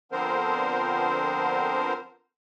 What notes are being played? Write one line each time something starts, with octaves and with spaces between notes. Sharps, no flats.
D3 F3 B3 C4 A#4 C5